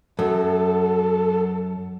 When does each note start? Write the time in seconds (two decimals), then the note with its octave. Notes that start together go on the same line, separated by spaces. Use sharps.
0.19 F#2 A4